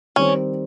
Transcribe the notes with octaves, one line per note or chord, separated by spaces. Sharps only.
D#3 G3 C4 C#4